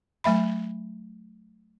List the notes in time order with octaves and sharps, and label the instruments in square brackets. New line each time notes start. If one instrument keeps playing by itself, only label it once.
[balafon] F#3 A3 E5 B5